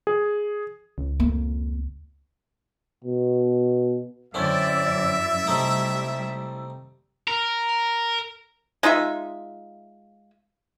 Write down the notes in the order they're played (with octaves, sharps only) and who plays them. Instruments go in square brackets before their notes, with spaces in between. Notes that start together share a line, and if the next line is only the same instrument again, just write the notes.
[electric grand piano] G#4
[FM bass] C#2
[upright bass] F2 A#3
[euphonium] B2
[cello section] F#2 D5 [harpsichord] D3 C4 C#4 [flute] E4 [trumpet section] E5
[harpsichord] C3 A3 D#4 [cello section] G3
[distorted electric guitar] A#4
[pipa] G#3 D#4 F4 E5